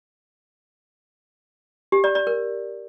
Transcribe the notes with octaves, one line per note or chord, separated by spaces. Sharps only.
G4
D5
D5
A#4